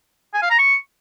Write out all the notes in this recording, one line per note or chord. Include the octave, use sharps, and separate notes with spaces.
G#5
F5
A#5
C#6